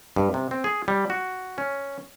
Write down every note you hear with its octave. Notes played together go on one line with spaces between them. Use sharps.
G2
C3
C4
G#4
G3
F#4
C#4